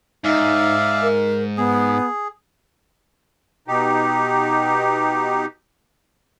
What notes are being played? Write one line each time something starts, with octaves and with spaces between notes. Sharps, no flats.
G#2 D#4 D5 E5 F5
A#4
B3 G#4
B2 D#4 G4